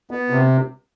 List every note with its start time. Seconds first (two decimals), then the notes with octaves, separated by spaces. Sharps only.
0.11 B3
0.30 C3